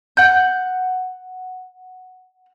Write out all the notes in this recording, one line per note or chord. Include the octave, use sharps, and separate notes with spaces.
F#5 G6